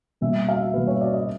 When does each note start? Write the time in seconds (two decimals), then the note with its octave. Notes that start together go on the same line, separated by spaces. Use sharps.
0.21 B2 G3 A#3 E5
0.49 F5
0.61 E5
0.74 B2 G3 A#3 B4
0.87 C#5
1.01 D5
1.13 D#5